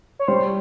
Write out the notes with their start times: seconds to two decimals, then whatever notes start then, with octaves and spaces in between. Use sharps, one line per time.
0.19 C#5
0.28 G3 C5